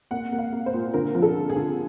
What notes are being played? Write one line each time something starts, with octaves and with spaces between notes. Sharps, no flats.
A#3 F#5
A#3
F5
A#3
C5
A#2
D3 A#4
F3
A4
D3
G#4
D3